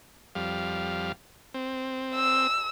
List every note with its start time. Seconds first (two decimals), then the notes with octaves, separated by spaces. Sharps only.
0.35 F2 G3 F5
1.54 C4
2.15 E6